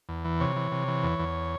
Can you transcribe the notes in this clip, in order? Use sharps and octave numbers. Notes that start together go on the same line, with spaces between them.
E2
E3
C3 C#5
E3
C3
E3
E2
E2